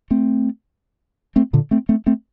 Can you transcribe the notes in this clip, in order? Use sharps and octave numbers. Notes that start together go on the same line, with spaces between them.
A3 C4
A3 C4
A#2 D3
A3 C4
A3 C4
A3 C4